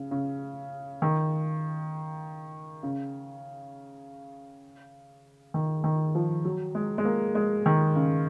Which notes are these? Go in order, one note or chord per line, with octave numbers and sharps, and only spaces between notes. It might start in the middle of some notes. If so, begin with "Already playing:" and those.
Already playing: C#3
C#3
D#3
C#3
D#3
D#3
F3
F#3
G#3
G#3
A#3
G#3
D#3
C#3